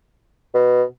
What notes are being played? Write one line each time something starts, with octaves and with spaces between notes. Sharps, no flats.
B2